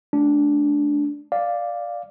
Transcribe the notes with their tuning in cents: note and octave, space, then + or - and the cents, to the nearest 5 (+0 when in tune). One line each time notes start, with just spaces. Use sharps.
A3 -35 D4 -10
D5 +0 F5 +0